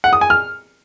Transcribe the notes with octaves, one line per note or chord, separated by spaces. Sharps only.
F#5
D#6
G#5
F6